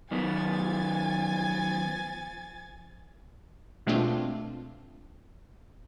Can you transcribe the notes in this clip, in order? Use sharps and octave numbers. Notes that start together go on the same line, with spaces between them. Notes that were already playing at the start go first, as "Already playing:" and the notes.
F#2 D#3 F3 B3 G#5 A6
B2 G#3 A3 C4 D4 F4